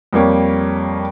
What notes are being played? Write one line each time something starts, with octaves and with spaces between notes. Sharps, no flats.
F2 G3 A#3 C#5